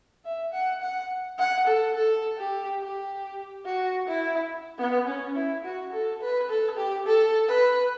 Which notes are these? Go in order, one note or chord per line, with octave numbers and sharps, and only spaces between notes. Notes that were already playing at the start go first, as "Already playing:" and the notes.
E5
F#5
F#5
F#5
A4
A4
G4
G4
F#4
E4
B3
C#4
E4
F#4
A4
B4
A4
G4
A4
B4